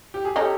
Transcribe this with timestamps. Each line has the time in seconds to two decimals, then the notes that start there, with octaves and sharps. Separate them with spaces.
0.14 G4
0.25 G#4
0.35 C#4 D#4 G4 A4